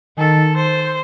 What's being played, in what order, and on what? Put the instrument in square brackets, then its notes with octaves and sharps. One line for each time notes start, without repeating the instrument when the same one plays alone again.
[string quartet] D#3 [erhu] A4
[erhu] C5